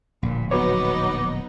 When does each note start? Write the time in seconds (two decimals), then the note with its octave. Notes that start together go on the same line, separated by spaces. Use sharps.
0.23 D1 A#1 A#2
0.51 F#3 B3 D#4 F#4 B4 C#5 D6